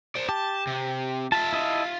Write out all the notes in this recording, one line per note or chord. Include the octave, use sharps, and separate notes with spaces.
C5 D5
G4 A5
C3
F4 E5 A5
E4 D#5 A5